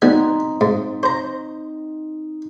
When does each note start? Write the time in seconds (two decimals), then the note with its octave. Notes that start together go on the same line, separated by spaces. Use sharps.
0.02 G3 B3 C4 D#4 G#5
0.61 G#2
1.03 C5 A#5